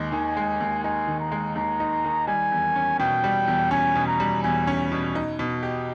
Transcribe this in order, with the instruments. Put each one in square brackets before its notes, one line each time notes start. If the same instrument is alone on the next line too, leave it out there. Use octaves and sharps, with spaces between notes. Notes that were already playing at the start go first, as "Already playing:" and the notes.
Already playing: [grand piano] D#2 G#3 D#4
[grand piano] D#3 [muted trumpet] G#5
[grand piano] G#3
D#2
[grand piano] D#4 [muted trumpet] G#5
[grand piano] D#3
[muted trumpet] A#5
[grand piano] G#3
[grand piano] D#2 [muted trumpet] A#5
[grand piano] D#4
D#3
[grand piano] G3 [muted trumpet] G#5
[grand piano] E2
C#4
[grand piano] B2 [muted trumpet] G5
[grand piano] G3
E2
[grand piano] C#4 [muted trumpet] G#5
[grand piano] B2
[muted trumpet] A#5
[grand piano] G3
[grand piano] E2 [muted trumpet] G#5
[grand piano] C#4
B2
D#4
B2
G4